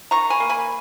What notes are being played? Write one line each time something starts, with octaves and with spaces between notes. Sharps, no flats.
D#3 A#5 C#6
G#5 B5
A#3
G#5 B5